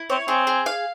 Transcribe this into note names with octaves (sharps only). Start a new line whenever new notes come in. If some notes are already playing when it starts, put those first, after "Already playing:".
Already playing: E4
C4 C#5
C4 G#4
G#4
F5